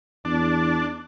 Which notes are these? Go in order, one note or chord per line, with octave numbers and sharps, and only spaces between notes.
E2 D4